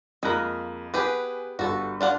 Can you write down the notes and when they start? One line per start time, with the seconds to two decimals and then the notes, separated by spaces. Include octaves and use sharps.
0.23 F2 G#3 A#3 A#4 B5 F#6
0.94 B3 G4 G#4 B4 G#5
1.59 G1 F#4 A4
2.01 D4 F4 F#5